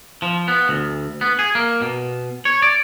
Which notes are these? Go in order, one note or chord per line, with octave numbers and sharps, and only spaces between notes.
F3
B3
D2
B3
G#4
A#3
B2
C#5
D5